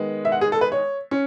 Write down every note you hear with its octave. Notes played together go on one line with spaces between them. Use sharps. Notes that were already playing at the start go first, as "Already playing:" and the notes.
Already playing: D#3 G#3 B3
E5
F#5
G#4
A4
B4
C#5
C#4